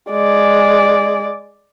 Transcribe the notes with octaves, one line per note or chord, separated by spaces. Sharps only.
G#3 D5